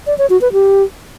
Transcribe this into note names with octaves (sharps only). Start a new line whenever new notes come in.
D5
C#5
F#4
B4
G4